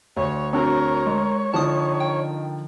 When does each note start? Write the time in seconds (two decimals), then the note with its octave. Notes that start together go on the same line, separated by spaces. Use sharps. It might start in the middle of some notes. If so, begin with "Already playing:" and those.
0.17 D2 C#5
0.53 C4 D4 F#4 A#4 C#5
1.07 G#3
1.54 D3 D#3 F3 A5 D#6
2.00 G5